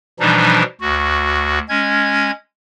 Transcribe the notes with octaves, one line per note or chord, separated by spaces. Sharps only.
B2 E3 F3 G3 D4 D#4
D2 F#4
G#3 C#4 G#6